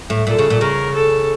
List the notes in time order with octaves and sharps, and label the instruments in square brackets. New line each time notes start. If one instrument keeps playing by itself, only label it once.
[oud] A2
[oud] A#2 [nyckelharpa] A4
[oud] C#3
A#2
[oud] C#3 [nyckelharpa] A#4
[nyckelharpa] A4